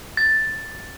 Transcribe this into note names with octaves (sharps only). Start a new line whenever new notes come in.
A6